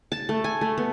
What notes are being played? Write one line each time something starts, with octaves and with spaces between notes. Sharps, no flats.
A5
A3
G#5
A3
B3